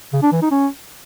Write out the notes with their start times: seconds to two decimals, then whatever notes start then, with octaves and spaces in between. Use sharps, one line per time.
0.13 C#3
0.22 D4
0.32 E3
0.42 D#4
0.51 C#4